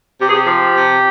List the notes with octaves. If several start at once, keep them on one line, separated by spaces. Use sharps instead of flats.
C3 G4
G#4
G4
F3
C3